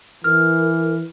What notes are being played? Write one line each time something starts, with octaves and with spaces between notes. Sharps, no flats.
E3 A#4 F6